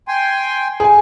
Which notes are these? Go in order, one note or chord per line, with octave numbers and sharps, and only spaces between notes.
G5 G#5 C6
G#4 G#5